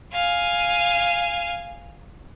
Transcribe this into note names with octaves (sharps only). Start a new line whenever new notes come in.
F5 G#5